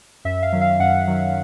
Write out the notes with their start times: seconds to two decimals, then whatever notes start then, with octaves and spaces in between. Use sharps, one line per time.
0.25 F#2 E5
0.43 F5
0.53 D#3 F#3
0.61 F5
0.79 F#2 F#5
1.07 D#3 F#3